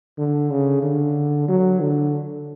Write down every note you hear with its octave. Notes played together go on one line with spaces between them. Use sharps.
D3
C#3
D3
F#3
D3